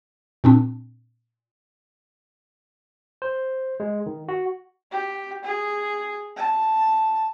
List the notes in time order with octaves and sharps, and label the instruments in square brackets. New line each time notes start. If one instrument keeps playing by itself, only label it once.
[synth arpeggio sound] A#2 C4 D4
[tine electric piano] C5
G#3
D#3
F#4
[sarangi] G4
G#4
A5